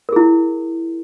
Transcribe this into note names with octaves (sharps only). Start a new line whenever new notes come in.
E4 G#4 A#4